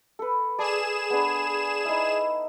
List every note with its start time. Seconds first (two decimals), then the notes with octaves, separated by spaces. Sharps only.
0.19 A4 B4
0.58 G#4 D5 A5 E7
1.10 B3 D4
1.85 D#4 E4